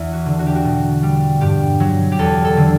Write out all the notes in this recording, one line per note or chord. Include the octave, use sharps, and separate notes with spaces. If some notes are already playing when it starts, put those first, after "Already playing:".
Already playing: E2 E4
F#4
D3
F#4
G4
F#4
B2
G3
G2 G4
F#3
G4
E2 A4
A4
D3